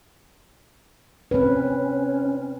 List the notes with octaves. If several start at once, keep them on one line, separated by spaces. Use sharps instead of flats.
C4 C#4 B4